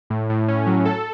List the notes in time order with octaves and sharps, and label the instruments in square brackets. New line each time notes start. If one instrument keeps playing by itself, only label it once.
[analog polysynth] A2
A2
C#4
F#3
A4